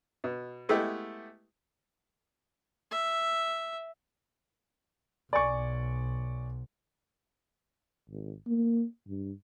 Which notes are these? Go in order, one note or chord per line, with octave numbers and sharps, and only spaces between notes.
B2
G#3 A3 B3 E4 G4
E5
B1 D5 G#5 C#6
G#1
A#3
G2